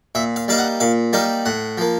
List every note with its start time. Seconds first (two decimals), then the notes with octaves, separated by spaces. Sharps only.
0.15 A#2 E5
0.36 F5
0.48 G3 A#3 D#4 F5
0.58 F#5
0.80 A#2 F5
1.13 G3 A#3 D#4 F5
1.46 A2 F#5
1.78 F3 A#3